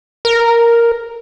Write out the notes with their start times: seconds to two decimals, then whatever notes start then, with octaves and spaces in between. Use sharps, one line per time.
0.25 A#4